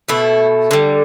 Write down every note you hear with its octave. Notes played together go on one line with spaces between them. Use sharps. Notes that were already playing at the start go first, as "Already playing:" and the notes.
B2 A3 E4
D3 G3